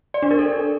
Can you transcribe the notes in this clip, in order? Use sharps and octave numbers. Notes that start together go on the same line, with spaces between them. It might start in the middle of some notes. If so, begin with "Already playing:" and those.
D5
D4
A#4
A4